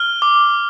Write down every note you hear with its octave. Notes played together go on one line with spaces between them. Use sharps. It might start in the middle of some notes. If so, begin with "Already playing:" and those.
Already playing: F6 G7
D6